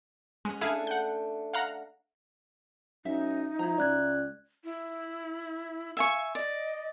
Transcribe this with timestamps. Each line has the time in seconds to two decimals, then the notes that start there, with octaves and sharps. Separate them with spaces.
0.45 G#3 C#4 B4 F#5
0.61 A3 D4 E4 G#4 F5 G#5
0.87 F#5 G6
1.53 F5 F#5 A#5
3.05 F#2 D#4 E5
3.59 F3 E4 A#5
3.78 C#2 D5 F#6 G#6
4.64 E4
5.97 E5 F5 G#5 C#6
6.35 D5 D#5